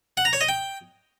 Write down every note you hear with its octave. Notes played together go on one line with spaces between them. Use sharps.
F#5
A#5
C#5
D#5
G5